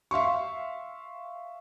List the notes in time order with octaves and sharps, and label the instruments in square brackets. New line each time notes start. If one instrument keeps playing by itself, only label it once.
[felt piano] E5 F5 C6 C#6